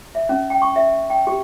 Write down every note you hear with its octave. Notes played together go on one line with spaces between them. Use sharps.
E5
C#4
G5
C#6
E5
G5
G4